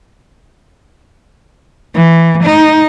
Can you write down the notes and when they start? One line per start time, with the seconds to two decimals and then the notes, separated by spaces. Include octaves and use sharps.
1.94 E3
2.43 D#4